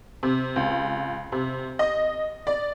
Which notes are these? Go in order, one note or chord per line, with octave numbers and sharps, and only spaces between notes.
C3
C#2
C3
D#5
D5